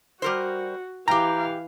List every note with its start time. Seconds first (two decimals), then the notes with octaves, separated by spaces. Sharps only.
0.22 G3 F#4 A#4 C5
1.08 E3 G4 F5 G5 A#5